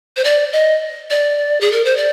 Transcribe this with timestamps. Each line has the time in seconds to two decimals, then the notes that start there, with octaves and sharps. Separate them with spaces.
0.17 C5
0.24 D5
0.53 D#5
1.10 D5
1.61 G#4
1.72 A#4
1.85 C5
1.97 D5